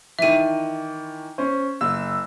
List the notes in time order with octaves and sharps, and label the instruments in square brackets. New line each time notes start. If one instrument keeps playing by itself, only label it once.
[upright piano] D#3 E3 [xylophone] E5 D#7
[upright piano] C#4 C5
F#1 E6